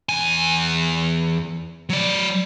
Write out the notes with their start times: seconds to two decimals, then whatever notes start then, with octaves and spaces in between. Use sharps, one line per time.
0.09 E2 G#5
1.89 F#3 D5